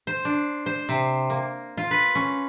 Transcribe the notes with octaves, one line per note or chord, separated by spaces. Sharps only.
C5
D4
C5
C3
A#3
F4
B4
C#4